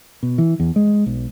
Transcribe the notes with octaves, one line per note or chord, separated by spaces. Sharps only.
B2
E3
E2
G#3
B1